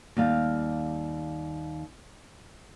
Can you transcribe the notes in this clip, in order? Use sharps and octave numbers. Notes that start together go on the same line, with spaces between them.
D#2 G3 F5